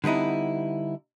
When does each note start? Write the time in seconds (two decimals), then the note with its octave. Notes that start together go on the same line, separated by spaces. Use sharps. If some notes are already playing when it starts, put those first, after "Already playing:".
0.04 D3 G3 B3 D#4 E4